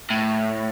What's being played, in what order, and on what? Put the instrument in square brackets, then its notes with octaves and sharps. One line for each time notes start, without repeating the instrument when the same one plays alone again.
[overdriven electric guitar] A2